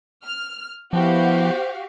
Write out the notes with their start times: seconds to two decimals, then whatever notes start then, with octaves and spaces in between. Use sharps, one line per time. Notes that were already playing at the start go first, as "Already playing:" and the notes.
0.23 F6
0.93 F3 B3 E4 F#4 G4 C5 F5